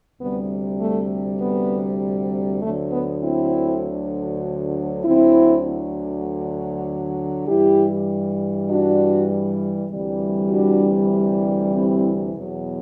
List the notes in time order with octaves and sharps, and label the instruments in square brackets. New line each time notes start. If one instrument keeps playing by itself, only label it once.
[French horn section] D2 C3 G3 B3
A3
B3
D2 D3 F#3 A3
B3
C4 E4
D2 D3 F#3 C4 E4
G2 E3 G3 E4 G4
D4 F#4
D2 C3 E3 G3
D4 F#4
C4 E4
E2 B2 F#3